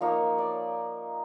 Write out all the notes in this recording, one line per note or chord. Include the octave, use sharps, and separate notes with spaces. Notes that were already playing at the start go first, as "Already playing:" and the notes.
F3 A#3 D#4 C#5
D5